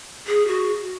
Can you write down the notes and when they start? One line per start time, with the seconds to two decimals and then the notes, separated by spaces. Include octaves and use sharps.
0.27 G#4
0.48 F#4